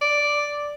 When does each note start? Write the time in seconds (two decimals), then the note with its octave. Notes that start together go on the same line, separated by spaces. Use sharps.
0.01 D5